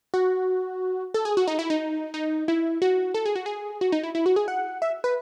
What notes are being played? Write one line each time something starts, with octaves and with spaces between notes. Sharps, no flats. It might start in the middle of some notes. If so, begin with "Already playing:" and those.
F#4
A4
G#4
F#4
D#4
E4
D#4
D#4
E4
F#4
A4
G#4
F#4
G#4
F#4
D#4
E4
E4
F#4
G#4
F#5
E5
B4